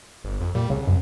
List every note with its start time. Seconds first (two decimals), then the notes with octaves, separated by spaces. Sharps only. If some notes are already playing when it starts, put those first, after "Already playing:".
0.24 G1
0.40 F2
0.55 A#2 G3
0.70 C2 C#3
0.87 F#2